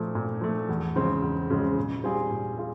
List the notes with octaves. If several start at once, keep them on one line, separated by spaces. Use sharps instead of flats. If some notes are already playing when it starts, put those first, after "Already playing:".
Already playing: A#2 F3 A3
A#2
F3 A3
E2
C#3 F3 G#3 C4
E2
C#3 F3 G#3 C4
A#2
G3 C4 F4 G#4
A#2
F4 G#4